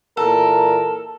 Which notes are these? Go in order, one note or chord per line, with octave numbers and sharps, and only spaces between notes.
A#2 E3 A4 A#4